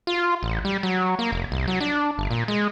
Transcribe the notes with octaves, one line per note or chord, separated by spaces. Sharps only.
F4
A1
G3
F#3
A#3
F1
C2
F#3
D4
G1
A#2
G#3